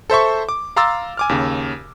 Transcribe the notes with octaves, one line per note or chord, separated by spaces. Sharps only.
A4 C5 E5 C#6
D6
F5 A#5 C6 D6 E6 A6
G#5 D6 F6
D#2 C#3